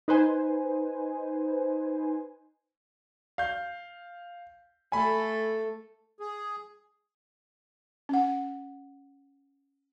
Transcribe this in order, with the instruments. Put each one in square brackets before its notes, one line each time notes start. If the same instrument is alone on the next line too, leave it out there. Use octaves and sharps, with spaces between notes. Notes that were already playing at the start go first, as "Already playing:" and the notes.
[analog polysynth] D#4 B4 C5 G#5
[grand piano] F5 G6
[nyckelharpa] A3 A4 [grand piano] G#5 B5
[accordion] G#4
[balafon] C#4 F#5